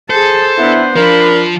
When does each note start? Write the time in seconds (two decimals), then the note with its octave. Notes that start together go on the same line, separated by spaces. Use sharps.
0.10 G#4 A4 C5 A5
0.58 B3 D4 E4
0.96 F3 D4 F4 A#4 B5